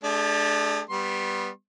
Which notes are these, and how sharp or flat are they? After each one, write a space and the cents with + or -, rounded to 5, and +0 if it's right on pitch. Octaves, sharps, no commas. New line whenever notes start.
A3 -35 D4 +0 G4 +45
G3 +0 B3 +0 C6 +35